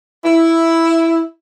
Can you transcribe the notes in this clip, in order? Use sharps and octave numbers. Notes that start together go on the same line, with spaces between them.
E4